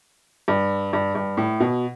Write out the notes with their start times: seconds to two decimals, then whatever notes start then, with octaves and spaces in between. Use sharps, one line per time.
0.48 G2
0.93 G2
1.15 G2
1.37 A2
1.60 B2